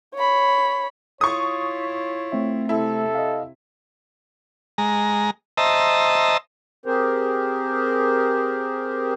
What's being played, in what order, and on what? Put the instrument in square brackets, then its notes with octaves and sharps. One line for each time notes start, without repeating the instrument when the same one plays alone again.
[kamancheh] C#5 B5
[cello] E4 F4 [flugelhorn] C#5 [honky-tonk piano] C#6 D#6
[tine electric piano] A3 C4 E5
[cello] C3 [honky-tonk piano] E4 [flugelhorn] A4
[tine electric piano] D#5 F5
[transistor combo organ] G#3 A#5
C5 D#5 E5 A5 A#5
[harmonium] C4 G4 G#4 A#4 C5